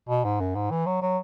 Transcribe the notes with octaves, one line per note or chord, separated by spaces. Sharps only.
B2
G#2
F#2
G#2
E3
F#3
F#3